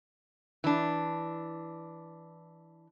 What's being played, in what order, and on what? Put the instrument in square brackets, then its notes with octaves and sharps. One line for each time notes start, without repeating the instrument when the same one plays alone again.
[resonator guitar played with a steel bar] E3 D4